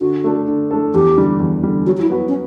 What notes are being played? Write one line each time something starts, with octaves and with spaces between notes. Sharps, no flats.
D3 F#4
A3 D4 A4
D3
A3 D4 A4
E2 G4
D3 G3
E2
D3 G3
F#3 F#4
F#4
E4
B3 F#4 B4
C#4